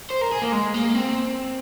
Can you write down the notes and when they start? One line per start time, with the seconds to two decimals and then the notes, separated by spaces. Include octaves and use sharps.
0.10 C5
0.22 A#4
0.32 G#4
0.42 A#3
0.52 G#3
0.74 A#3
0.95 C4